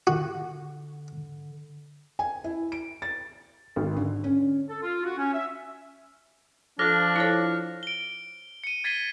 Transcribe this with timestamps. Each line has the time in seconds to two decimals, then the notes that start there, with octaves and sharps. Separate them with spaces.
0.07 D3 F#4
2.19 G#5
2.44 E4
2.72 D7
3.02 A6
3.76 G#1
3.97 D3
4.24 C#4
4.69 A4
4.83 F4
5.03 F#4
5.18 C#4
5.33 E5
6.79 F3 D4 A4 C5 D6 F6 A#6
7.16 E4 A4 C#5
7.83 D7 G7
8.64 C#7 D#7
8.84 G#6 A6 B6 C7 D#7 G7